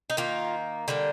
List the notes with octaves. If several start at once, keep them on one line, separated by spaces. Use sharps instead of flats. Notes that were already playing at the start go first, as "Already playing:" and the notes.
D#4
D#3 A#3 F4
D3 G3 A#3